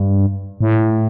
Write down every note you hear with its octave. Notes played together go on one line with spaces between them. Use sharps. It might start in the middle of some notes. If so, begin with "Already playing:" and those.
Already playing: G2
A2